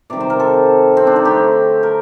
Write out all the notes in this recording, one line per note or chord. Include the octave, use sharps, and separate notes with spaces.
C3 D#3 G3 D5
C5
A#4
A4
C4
D4
D#4
D3 A3 G4
A#4